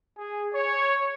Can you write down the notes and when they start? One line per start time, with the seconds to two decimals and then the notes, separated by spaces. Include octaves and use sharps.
0.18 G#4
0.54 C#5